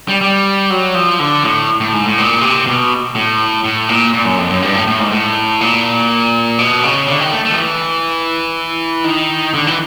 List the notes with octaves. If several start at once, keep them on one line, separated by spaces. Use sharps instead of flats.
G3
G3
F#3
F3
D3
A2
A2
G#2
A2
A#2
C3
B2
A2
A2
A#2
A#2
F#2
F2
F#2
G2
A2
A2
G#2
A2
A#2
B2
C#3
D3
D#3
A3
A3
F3
E3
D#3
D3
E3